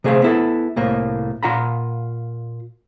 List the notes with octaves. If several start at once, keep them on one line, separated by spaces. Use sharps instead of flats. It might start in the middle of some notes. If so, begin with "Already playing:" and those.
C3 A3 G#4 C5 F5
B3 E4 A4
C2 A2 A#3
A#2 F4 F#5 A#5 B5